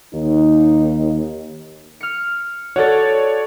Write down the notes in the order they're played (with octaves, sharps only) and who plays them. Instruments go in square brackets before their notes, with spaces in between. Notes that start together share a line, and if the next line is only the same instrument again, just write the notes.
[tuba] D#2 [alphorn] D#4
[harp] F6 C#7
[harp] F#4 A4 [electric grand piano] C#5 D5 A6